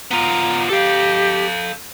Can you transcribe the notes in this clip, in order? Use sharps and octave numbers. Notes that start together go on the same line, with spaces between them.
B3 F4 A#5
G4 A4 F5